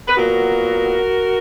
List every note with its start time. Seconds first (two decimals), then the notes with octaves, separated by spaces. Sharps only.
0.07 B4
0.15 A#2 F#3 B3 F#4 A#4